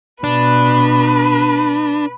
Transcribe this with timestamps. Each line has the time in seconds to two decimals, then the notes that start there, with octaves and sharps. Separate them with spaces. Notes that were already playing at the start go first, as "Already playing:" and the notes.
0.24 B2 D4 B4